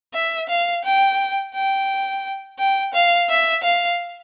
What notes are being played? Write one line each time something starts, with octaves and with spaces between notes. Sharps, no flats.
E5
F5
G5
G5
G5
F5
E5
F5